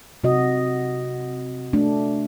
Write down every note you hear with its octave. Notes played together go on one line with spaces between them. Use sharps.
C3 F#4 D#5
A3 D4